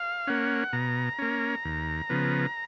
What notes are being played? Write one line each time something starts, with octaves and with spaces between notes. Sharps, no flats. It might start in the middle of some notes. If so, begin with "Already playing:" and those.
Already playing: F5
A#3 C#4 F#5
B2 A#5
A#3 C#4
D#2
C#3 F3 B3